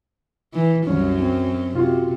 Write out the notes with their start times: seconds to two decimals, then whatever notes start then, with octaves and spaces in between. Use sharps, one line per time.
0.53 E3
0.87 C2 F#2 F#3 C#4
1.20 C4
1.75 C3 F4 F#4